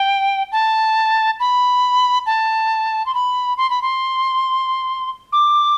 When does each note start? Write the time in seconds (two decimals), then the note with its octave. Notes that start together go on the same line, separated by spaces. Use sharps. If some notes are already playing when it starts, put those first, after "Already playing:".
Already playing: G5
0.52 A5
1.40 B5
2.26 A5
3.06 C6
3.14 B5
3.57 C6
3.70 B5
3.82 C6
5.32 D6